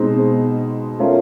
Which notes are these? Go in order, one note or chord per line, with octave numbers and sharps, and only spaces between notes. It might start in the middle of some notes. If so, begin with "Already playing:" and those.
Already playing: B2 G#3 C4 D#4
A3 C#4 F4 A#4